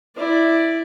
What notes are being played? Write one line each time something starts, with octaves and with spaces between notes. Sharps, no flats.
E4 D5